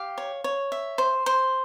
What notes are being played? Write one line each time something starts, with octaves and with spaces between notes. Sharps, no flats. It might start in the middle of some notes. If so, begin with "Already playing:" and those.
Already playing: G4 F5
C#5
C#5
E5
C5
C5